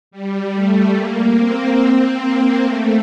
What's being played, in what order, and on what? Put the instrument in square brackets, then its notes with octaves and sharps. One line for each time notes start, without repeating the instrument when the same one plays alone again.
[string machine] G3
A3
A#3
C4
C4
A#3
A3